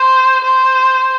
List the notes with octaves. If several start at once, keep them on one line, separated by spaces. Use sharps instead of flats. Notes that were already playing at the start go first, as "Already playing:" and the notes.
Already playing: C5
C5